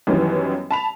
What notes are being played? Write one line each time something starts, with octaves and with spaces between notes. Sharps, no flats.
F#2 D#3 E3 G3 B3 C#4
A5 B5 F7